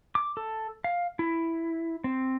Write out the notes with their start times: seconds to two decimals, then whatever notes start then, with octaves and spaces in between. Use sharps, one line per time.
0.15 D6
0.37 A4
0.84 F5
1.19 E4
2.04 C4